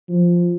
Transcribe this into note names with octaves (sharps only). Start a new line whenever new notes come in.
F3